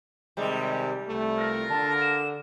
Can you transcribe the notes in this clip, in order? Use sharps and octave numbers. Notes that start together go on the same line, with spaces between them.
C3 D#3 G3 G#3
C2 A3
F4 A#4
D3 A5
E7